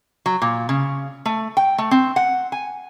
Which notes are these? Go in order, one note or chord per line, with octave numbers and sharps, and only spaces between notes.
F#3
A#2
C#3
A3
G5
A3
C4
F#5
G#5